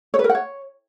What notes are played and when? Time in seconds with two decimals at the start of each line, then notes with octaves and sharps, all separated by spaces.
0.14 C#5
0.19 B4
0.24 A#4
0.29 F#5
0.35 C#5